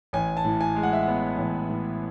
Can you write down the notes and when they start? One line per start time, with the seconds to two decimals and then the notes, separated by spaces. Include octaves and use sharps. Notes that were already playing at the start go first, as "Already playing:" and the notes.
0.13 A1 G#5
0.37 A5
0.45 A2
0.61 G#5
0.76 G#3
0.83 F#5
0.93 E5
1.03 B3 F#5
1.38 A1
1.69 A2